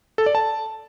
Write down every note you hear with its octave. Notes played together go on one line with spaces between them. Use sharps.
A4
D5
A5